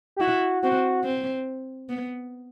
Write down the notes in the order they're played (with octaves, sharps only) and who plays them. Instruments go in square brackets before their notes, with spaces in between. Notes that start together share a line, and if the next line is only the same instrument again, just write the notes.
[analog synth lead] G4
[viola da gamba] E4 [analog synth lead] F#4
[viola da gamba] C4 [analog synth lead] F#4
[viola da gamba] C4
B3